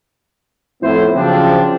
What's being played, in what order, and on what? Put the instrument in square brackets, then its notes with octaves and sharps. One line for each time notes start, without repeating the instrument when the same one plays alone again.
[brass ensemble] F2 A2 B3 E4 C5
C#3 F3 F#3 C4 D4